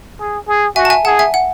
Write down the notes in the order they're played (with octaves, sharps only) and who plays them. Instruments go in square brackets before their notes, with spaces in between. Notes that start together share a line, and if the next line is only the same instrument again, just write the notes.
[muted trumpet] G#4
G#4
[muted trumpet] F#4 [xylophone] E5 G#5
[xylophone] A5
E5 G#5
[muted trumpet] G#4 [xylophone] F#5 A5
[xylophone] E5 G#5
F#5